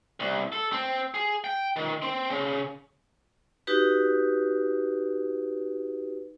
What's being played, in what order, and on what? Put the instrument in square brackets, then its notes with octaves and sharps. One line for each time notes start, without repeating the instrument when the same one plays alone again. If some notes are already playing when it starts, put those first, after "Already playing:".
[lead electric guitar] C2
A4
C4
G#4
G5
D#3
C4
C#3
[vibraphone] D#4 F#4 G4 B4